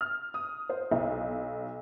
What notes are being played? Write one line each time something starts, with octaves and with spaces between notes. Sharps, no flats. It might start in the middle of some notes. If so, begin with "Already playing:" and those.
F6
D#6
C5
B1